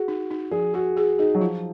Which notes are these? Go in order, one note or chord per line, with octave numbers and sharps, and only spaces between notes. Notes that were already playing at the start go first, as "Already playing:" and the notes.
Already playing: F#4 G#4
D#4
D#4
F3 G#4
F#4 G#4
G#4
D#4 G#4
F#3
F3 F4